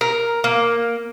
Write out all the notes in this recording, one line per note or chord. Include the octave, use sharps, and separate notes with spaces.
A#4
A#3